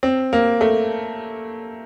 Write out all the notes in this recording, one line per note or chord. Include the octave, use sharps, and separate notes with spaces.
C4
A#3
A3